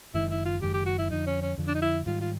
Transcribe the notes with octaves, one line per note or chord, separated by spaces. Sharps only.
F#1 F#2 D#3 G#3 E4
E4
F4
F#1 F#2 D#3 G#3 G4
G4
F#4
E4
F2 D3 F3 D#4
C#4
C#4
F2 D3 F3
D4
D#4
E4
G#2 D#3 G3 F4
F4